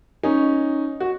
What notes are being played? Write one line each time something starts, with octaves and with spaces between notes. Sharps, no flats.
C#4 D#4
F#4